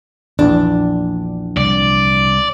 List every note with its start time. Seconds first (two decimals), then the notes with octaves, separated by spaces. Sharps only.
0.39 A#1 E2 D4
1.57 C2 D5